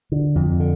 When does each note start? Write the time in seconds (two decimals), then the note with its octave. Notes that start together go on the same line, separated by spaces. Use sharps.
0.12 D3
0.35 F2
0.60 D3